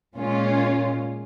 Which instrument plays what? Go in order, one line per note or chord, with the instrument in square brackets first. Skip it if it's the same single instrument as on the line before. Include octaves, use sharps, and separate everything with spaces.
[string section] A#2 G#3 C#4 F4